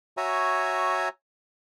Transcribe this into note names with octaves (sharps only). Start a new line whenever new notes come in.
F#4 C#5 E5 G#5 A#5